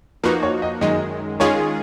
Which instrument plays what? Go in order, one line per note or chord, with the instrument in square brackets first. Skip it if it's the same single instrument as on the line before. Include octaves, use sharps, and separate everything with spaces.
[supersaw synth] F3 A#3 D#4 F#4 [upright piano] B4
[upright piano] C#5
D#5
[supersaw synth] F#2 D#3 G#3 [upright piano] D#5
[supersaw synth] D#3 G#3 C#4 F4 G#4 [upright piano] C#5